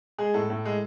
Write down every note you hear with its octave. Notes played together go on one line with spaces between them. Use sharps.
G#3 G#4
A2 A4
A2
G#3